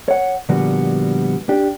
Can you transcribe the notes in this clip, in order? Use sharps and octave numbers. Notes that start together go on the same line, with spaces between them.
C#5 F#5
A#2 D3 F3 G3 B3 F#4
D4 G4